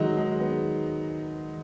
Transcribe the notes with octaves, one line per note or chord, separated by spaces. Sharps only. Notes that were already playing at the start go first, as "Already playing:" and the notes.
Already playing: D#3 F#3 G#3 D#4
G#3
G#3
B3